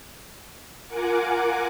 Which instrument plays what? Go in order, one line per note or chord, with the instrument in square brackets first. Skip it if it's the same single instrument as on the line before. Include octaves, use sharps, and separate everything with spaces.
[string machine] F4 A#4 F#5 G#5 D6